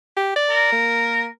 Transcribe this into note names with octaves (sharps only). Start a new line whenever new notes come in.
G4
D5
A#4
A#3